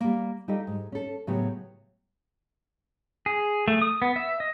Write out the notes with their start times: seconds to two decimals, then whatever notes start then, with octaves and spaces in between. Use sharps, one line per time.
0.01 G3 A#3
0.48 G3 D#4 F4 G4 A4 D#5
0.67 G#2
0.92 C#4 A4
1.27 A2 C#3 F#3 B3 G4 C#5
3.26 G#4
3.68 A3
3.81 D#6
4.02 B3
4.16 E5
4.40 D#5